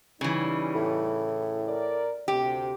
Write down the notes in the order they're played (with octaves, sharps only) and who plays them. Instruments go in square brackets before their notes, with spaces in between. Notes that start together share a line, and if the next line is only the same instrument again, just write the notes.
[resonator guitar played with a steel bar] C#3 E3 [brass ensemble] G3 C#4 D#4
[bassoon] A2
[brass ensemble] A#4 D5
[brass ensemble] D2 C3 [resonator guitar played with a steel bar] G4